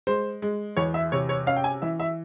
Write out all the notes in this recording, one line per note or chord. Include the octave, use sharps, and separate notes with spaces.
G#3 C5
G#3
E2 C#5
E5
C3 C#5
C#5
C#4 F5
G5
G#5
E3 E5
E5